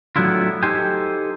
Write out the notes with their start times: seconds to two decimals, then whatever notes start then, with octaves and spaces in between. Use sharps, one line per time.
0.16 A2 F#3 B3 D4 E4 F4
0.63 D#4 G4 A4 C5 G5 G#5